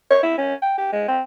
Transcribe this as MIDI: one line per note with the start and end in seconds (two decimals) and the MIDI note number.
0.11 0.20 73
0.23 0.34 64
0.38 0.54 61
0.62 0.76 79
0.78 0.92 67
0.92 1.04 56
1.08 1.21 60